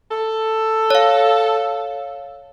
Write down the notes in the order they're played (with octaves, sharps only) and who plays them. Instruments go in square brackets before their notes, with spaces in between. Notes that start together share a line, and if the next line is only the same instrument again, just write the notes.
[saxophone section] A4
[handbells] C#5 F5